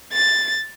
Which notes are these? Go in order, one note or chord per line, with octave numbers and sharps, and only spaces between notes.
A6